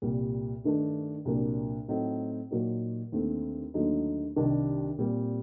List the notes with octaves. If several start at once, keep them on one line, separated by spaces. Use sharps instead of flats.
C2 A#2 G3
G2 D#3 A3 D4
C2 A#2 F#3 A#3 D4
A2 F#3 A3 C4 D#4
A#2 F#3 A#3 D#4
D#2 D3 A3 C4
D#2 D3 F#3 A3 D#4
C2 C3 D#3 G3 D4
A#2 G3 C4